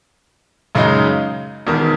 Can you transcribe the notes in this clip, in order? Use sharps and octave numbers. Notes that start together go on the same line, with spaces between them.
F#2 C#3 G#3 D#4
E1 E2 D#3